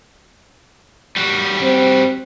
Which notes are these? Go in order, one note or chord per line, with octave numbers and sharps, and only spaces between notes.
G3 F#4
C4